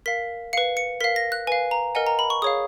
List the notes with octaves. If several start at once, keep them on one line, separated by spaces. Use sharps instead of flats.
A#4 F5 B6
B4 F5 C#7
C#7
A#4 F5 B6
A#6
F#6
B4 F5 G#5
A#5
A#4 D#5 F#5 G#5
A#5
B5
C#6
G#4 C#5 F5 D#6